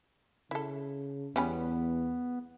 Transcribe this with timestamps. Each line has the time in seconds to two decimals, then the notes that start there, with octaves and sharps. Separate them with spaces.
0.51 C#3 E4 A4
1.36 E2 G3 B3 C#4 B5